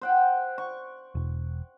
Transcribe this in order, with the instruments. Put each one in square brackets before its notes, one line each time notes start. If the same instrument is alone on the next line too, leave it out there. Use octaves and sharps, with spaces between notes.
[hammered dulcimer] C5 F#5 G5
C#6
[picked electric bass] E1